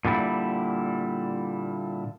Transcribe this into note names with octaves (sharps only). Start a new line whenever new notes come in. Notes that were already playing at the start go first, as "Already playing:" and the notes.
A#2 D3 G3 E4